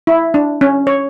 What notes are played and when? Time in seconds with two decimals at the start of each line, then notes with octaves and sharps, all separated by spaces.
0.07 E4
0.34 D4
0.61 C#4
0.87 C#5